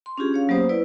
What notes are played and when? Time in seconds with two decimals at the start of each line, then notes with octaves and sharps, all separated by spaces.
0.06 C6
0.18 C#4 D4 F4 G4 G#4
0.32 C#4 C#5 F5
0.49 F#3 A#3 B3 G4 C5 D#6
0.69 E4 B4 D5